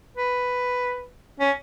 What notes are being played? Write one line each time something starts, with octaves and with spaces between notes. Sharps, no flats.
B4
C#4